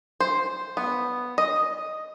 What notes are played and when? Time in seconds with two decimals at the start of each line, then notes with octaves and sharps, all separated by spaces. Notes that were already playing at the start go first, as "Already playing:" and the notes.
0.20 C5
0.77 B3
1.38 D#5